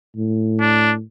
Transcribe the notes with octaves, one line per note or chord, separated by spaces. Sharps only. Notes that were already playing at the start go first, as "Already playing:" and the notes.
A2
D4